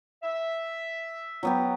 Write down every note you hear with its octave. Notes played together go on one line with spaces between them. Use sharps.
E5
F#3 B3 G4